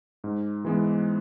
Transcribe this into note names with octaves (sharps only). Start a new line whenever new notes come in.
G#2
E3 G#3 B3